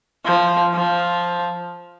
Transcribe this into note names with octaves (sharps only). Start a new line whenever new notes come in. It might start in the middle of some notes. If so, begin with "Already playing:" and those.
F3
F3